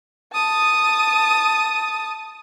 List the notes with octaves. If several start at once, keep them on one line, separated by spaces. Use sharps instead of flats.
A5 D#6